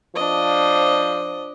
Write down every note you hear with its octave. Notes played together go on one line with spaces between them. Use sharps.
F3 D4 D#5